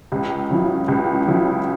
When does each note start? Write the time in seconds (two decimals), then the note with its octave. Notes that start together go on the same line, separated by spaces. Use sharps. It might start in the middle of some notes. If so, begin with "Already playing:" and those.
0.12 C#2
0.50 C#3 F#3 E4
0.88 C#2
1.27 C#3 F#3 E4